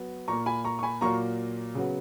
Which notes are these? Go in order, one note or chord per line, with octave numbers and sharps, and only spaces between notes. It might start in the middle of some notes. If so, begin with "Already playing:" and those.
Already playing: F#3 B3
A#2 A#3 A#5 C#6
G#5 B5
A#5 C#6
C#6
G#5 B5
A#2 F#3 A#3 A#5 C#6
C#3 F#3 B3